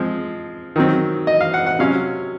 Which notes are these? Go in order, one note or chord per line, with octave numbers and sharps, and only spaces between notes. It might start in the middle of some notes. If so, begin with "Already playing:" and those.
Already playing: F3 G#3 C4
D#3 F#3 C4
D#5
F5
F#5
F#5
C3 F#3 C#4 F5